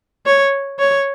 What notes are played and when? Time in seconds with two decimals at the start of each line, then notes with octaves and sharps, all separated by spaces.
0.26 C#5
0.79 C#5